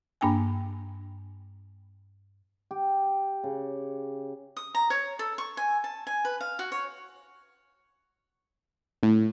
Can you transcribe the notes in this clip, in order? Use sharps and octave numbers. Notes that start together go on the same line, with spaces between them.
G2 A#3 D4 G5 G#5
G4
C#3
D#6
A#5
C#5
A4
C#6
G#5
A5
G#5
B4
F5
F#4
C#5
A2